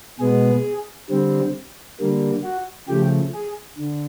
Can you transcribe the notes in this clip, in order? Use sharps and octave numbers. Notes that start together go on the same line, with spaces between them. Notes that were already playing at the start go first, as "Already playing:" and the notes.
B2 G#3 B3 G#4
D3 G3 C4
D3 G3 A#3
F#4
C#3 F3 A3 G4
G#4
D3